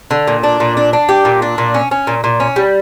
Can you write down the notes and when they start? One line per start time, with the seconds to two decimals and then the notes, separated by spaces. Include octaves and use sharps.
0.11 D3
0.27 A#2
0.43 D4
0.60 A#2
0.77 D4
0.93 D4
1.09 G4
1.25 A#2
1.42 D4
1.58 A#2
1.74 C#4
1.91 C#4
2.07 A#2
2.24 A#2
2.40 C#4
2.56 G3